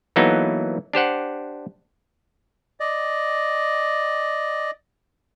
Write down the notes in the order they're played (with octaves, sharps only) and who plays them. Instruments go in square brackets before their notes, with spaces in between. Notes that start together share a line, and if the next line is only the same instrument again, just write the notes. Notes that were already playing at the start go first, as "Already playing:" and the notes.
[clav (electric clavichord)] E3 F#3 A#3 B3 D#4 A4
D4 G4 C5 F#5
[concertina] D5 D#5